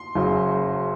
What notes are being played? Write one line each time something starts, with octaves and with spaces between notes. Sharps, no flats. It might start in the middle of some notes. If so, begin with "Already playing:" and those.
Already playing: C6
F#1 F#2 C#3 F#3